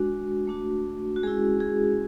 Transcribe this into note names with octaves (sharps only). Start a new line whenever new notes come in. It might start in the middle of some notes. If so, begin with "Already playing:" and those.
Already playing: G#3 D4 F#4
A3 D4 F#4
F#4
G#3 C#4 E4 G#4
G#4